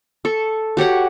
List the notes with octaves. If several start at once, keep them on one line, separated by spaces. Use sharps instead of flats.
A4 C#6
F#4 G4 C#5 F#5